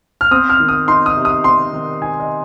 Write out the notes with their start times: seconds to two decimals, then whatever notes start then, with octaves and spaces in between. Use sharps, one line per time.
0.21 F6
0.31 C4 D#6
0.50 F6
0.60 D#3
0.69 D#6
0.88 D#4 C6
1.06 D#6
1.17 C3
1.25 D#6
1.44 C4 C6
1.73 D#3
2.02 D#4 G#5
2.20 D#5